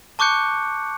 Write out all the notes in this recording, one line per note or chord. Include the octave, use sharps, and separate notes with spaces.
A5 C#6 D6 F#6 G6 C#7